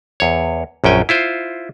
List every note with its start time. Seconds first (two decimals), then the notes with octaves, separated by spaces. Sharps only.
0.20 E2 C#5
0.84 A#1 F#2 C#4 G5 G#5
1.09 E4 F4 C5